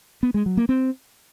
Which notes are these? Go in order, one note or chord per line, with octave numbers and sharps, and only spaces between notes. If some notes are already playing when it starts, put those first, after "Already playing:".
B3
G#3
F#3
A#3
C4